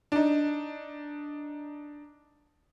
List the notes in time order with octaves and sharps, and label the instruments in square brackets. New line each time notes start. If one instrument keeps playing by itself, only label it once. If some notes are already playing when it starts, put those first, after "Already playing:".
[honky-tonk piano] D4 D#4